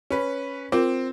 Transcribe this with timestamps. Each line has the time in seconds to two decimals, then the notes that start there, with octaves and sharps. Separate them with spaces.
0.10 C#4 B4
0.72 C4 F4 A#4